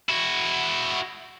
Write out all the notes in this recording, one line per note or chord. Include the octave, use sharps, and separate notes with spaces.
E4 F#4